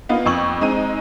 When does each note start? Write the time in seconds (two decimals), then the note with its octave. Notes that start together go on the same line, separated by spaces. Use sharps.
0.09 A#3 B3 D#4 F4
0.26 F2 C#6 F#7
0.61 G#3 C4 D#4 A#5 D#7